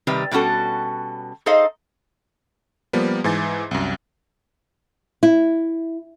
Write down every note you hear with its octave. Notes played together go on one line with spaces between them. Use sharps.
C3 D#3 G3 B4
B2 G3 C#4 F#4 A4
D#4 G#4 A4 C5 D#5 F5
F3 G3 A#3 B3
G#2 E3 G#5 A6
C2 F#2
E4